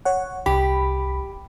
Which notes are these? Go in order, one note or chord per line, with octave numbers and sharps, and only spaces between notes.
C#5 F#5
C2 G4 B5